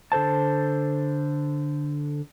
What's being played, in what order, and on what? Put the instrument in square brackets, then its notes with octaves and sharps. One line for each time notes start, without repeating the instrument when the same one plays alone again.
[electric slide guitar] D3 A4 C5 A5